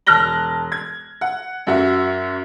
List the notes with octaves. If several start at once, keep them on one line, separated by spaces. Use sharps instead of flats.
E1 A5 F6 F#6 A#6 G7
G#6
F#5
F#2 F#4 E5